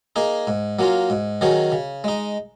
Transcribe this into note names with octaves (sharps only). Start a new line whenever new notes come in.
A#3 D#4 G#4
G#2
F#3 A#3 C#4 F4
G#2
D#3 F#3 C#4 G#4
C#3
G#3 D#4